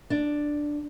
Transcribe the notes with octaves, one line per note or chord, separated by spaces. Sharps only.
D4